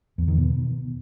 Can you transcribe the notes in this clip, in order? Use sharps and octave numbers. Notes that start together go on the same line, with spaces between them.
E2
D#3
B2